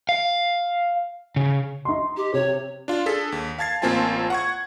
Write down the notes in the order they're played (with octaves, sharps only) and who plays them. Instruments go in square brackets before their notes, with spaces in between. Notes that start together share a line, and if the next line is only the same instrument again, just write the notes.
[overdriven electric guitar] F5
C#3
[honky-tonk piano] D#4 C6
[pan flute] G4
[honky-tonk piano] C3 [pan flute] C#5
[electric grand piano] D4 F4
D4 G#4 A4 B6
D#2
F5 A5 G#6 A6 C7
A1 A#3 C4 F4 G#5 A5
F#5 C#6 G#6